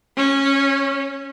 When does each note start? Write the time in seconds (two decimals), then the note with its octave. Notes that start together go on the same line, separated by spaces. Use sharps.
0.17 C#4